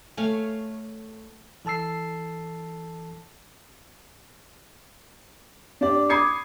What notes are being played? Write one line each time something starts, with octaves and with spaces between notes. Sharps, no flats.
A3 C#5 F5 G#5
E3 A4 A5 E6 C7
D4 G4 D5
B5 D6 D#6 G#6 C7 C#7